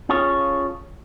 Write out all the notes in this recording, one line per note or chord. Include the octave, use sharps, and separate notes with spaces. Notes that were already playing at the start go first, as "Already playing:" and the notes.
C#4 F4 G#4 A4 C#5